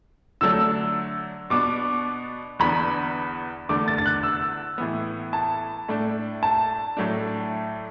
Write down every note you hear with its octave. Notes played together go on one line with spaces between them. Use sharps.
D3 F#3 A3 D4 E6
B2 B3 D4 D6
E2 D3 B3 D4 B5
E2 D3 A3 D4 D6
A6
A6
F#6
E6
A2 E3 B3
A5
A2 A3 D4
A5
A2 F#3 A3 D4